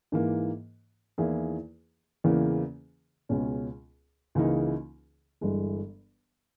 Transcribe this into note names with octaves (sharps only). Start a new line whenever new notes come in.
G#2 E3 A#3
E2 D#3 A#3 E4 G#4
E2 C#3 E3 A#3
C#2 B2 G#3 C#4 G#4
C#2 C#3 E3 A#3 D#4
G1 G2 E3 G#3